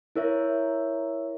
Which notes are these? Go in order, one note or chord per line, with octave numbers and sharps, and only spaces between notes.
E4 A#4 C#5 E5